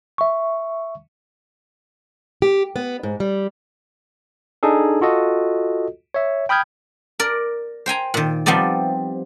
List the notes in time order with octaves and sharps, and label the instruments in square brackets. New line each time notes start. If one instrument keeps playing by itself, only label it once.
[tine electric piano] E5 C#6
[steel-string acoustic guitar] G4
B3
G#2
G3
[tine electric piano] D4 D#4 G#4 A4
F4 F#4 A4 D#5
C#5 E5
G5 B5 D#6 F6 G6 G#6
[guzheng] A#4 D5
C5 G5 G#5 A#5
A#2 D#3
F3 G3 B3 C4 D#4 D5